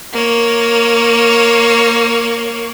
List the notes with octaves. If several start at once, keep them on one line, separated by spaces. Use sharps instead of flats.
A#3 C#5